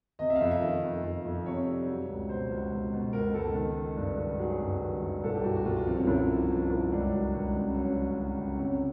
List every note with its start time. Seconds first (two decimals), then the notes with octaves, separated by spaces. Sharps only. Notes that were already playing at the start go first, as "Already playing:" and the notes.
0.19 C3 D#5
0.30 E5
0.36 F5
0.41 F2 E5
0.51 E5
0.61 D#3 D#5
0.83 F2
1.03 F2
1.25 F2
1.46 C3 C#5
1.66 G3
1.88 F#3
2.09 C#2
2.29 B2 C5
2.50 C#2
2.72 C#2
2.93 B2
3.13 C#2 A#4
3.34 C#2 A4
3.55 D#3
3.77 D#3
3.97 G2
4.19 D#3
4.39 F#3 G#4
4.61 G2
4.81 D#3
5.02 G2
5.24 C2 A4
5.34 G4
5.44 C2 F#4
5.56 F#4
5.65 C2 F4
5.77 F4
5.86 F3 C4
5.98 C#4
6.07 C2 E4
6.28 F3
6.50 F3
6.70 C2
6.91 C#2 D4
7.13 F#3
7.34 C#2
7.55 C#3
7.75 F#3 C#4
7.96 F#3
8.17 C#3
8.38 C#3
8.59 C3 C#4